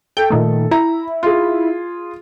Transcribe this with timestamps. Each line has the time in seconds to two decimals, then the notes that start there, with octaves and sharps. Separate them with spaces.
0.17 A4 G5
0.30 A#2 D#3 A3
0.71 E4 A#5
1.23 F4 G#4